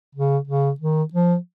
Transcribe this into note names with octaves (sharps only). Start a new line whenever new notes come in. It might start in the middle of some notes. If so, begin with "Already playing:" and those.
C#3
C#3
D#3
F3